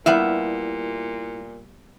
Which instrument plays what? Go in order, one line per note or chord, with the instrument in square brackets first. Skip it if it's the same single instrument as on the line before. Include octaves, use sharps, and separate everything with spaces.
[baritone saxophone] A#2 [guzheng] G3 B3 F5 [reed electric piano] E4 [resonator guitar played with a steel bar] E5